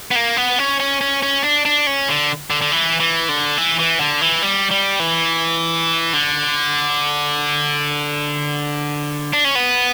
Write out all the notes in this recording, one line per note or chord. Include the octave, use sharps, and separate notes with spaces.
B3
A#3
B3
C#4
C#4
C#4
C#4
D4
D4
C#4
D3
D3
D3
E3
E3
D3
E3
E3
D3
E3
G3
G3
E3
D3
D4
C#4
B3